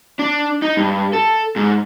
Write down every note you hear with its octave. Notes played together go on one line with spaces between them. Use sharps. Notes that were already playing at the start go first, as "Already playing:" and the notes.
D4
D#4
G2
A4
G#2